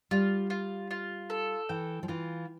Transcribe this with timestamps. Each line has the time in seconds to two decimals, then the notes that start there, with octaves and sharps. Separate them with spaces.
0.11 G3 F4
0.50 F4
0.91 F4
1.30 A4
1.69 E3 G5
2.03 F3
2.08 E3 F4